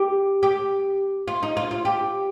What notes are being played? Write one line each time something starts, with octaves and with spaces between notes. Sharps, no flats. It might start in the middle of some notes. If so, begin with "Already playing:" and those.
Already playing: G4
G4
F4
D#4
F4
F4
G4